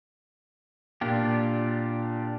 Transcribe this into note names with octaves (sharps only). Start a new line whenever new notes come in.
A#2 D4 F4 G4